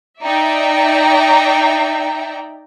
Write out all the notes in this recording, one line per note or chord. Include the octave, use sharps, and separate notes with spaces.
D#4 D5 E5 G5 A#5